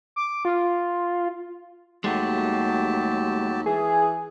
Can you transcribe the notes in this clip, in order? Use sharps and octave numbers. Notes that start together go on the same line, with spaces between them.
D6
F4
D#2 F#3 G#3 A3 G4 A5
E3 G#4